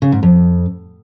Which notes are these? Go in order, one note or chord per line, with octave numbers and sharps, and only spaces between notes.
C#3
G#2
F2